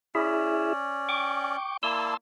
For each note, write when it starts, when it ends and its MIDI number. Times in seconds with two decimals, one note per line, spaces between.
0.15 1.56 61
0.15 0.73 64
0.15 0.73 68
0.15 1.56 74
0.15 0.73 76
1.09 1.77 79
1.09 1.77 85
1.09 1.77 86
1.83 2.14 58
1.83 2.14 64
1.83 2.14 74
1.83 2.17 81
1.83 2.17 84
1.83 2.17 88